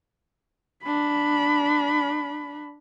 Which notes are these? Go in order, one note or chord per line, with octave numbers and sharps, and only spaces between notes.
D4 B5